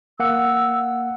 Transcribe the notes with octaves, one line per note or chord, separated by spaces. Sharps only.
A#3 F#5 E6